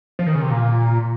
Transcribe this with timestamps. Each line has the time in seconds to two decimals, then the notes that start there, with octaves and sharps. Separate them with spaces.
0.19 F3
0.27 D#3
0.35 C#3
0.42 C3
0.50 A#2